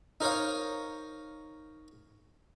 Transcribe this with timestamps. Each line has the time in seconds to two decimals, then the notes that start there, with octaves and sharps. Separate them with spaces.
0.21 D#4 A#4 C5 C#5 F5